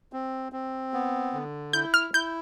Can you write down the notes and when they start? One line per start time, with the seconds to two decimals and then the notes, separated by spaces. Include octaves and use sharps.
0.13 C4
0.52 C4
0.94 B3
1.33 D3
1.73 E4 G6
1.94 F6
2.14 E4 G6